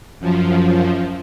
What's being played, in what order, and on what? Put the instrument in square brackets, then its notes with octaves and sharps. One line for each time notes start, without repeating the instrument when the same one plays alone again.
[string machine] F#2 F3